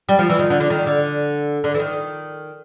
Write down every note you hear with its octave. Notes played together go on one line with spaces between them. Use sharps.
G3
F3
E3
D#3
D3
D3
D#3
D3
D3
E3
D#3